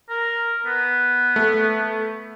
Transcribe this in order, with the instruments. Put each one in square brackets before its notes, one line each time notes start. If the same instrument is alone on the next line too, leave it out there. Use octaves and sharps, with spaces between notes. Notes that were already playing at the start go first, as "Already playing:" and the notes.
[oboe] A#4
B3
[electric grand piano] A3